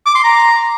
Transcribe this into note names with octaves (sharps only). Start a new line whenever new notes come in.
D6
C6
A#5